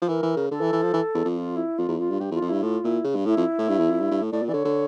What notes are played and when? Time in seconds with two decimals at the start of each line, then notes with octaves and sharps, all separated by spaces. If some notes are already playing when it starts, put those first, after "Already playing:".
0.02 F3
0.08 E3 A#4
0.22 E3
0.36 C#3
0.51 D3 A4
0.61 E3
0.72 E3
0.82 F3
0.93 E3
1.14 E2
1.25 F2
1.36 F4
1.56 E4
1.78 F2 F4
1.88 E2
1.99 F2 F4
2.10 G2
2.20 G2 G4
2.31 E2
2.34 F4
2.41 F2
2.49 G2 E4
2.63 A2 F4
2.84 A#2 E4
3.04 C#3
3.15 G2
3.26 A2 E4
3.37 F2
3.59 A2
3.68 G2
3.79 E2
3.90 F2
4.00 G2
4.11 G2
4.21 A2
4.32 A2 D5
4.43 A#2
4.48 E3 D5
4.53 D3 C#5
4.65 D3